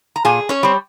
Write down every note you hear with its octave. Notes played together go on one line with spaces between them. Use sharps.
A#5
A#2 G#4 G#5
C#4 C#5
G3 C4